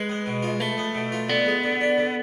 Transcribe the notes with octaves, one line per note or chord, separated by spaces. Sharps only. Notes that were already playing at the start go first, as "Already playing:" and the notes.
Already playing: G#3 B4
B3
B2
F4
A3 B4
B3
B2
F4
D3 B3
G#3
D3
D4
D3